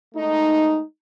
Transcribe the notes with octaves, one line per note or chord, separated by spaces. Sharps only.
G#3 A3 D#4